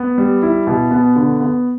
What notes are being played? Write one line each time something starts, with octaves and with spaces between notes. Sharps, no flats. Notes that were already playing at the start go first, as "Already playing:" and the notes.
Already playing: B3
G3
E4
B2
B3
D3
B3